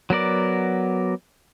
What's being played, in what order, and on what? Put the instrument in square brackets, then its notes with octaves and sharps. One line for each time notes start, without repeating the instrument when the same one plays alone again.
[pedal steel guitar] F#3 B3 A#4 D5